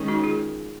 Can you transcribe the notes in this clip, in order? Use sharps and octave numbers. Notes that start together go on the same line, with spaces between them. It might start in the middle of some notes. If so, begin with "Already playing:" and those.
Already playing: D#3 G#3 C#4
D#4 F#4
F4 G#4